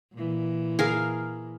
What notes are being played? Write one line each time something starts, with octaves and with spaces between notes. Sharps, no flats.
A#2 E3
G#4 A#4 F5